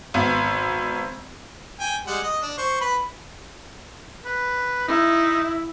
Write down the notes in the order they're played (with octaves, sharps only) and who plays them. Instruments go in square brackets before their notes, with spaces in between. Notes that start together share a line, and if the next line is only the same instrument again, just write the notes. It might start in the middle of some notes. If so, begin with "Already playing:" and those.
[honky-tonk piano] G#1 B3
[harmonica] G5 G#5
G3 G#3 F#5
D#5
D4
C5 C#6
B4 B5
[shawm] B4
[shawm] D#4 [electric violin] E4